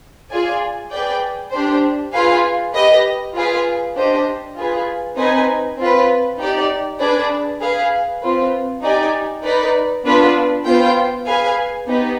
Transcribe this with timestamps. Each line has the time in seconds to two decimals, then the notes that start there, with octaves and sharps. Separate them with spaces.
0.30 F4 G#4 D5 G#5
0.91 G#4 B4 D5 G5
1.51 D4 G4 C5
2.13 F4 G#4 B4 F5 G#5
2.73 G4 B4 D#5
3.34 F4 G#4 B4 F5
3.95 D4 G4 C5 D#5
4.56 F4 G#4 B4
5.17 C4 D#4 B4 D#5 G#5
5.78 C4 F4 B4
6.39 D#4 G4 D5
7.00 D4 G#4 B4 D5
7.60 G#4 B4 F5
8.21 C4 F4 B4
8.82 D#4 G4 D5 G#5
9.44 D#4 B4 D5
10.04 B3 D4 F4 B4
10.65 B3 F4 C5 G5
11.26 G#4 B4 F5 G#5
11.87 B3 D#4 G4 B4